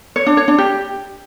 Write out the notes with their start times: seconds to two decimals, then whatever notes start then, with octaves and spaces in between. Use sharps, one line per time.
0.16 C#5
0.26 D4
0.37 C#5
0.48 D4
0.58 G4